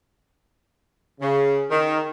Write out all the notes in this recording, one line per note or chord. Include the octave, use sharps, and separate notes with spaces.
C#3
D#3